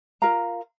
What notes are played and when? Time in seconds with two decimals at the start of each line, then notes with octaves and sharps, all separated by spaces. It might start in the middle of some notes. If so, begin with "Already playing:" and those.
0.22 F4 A#4 F5 A#5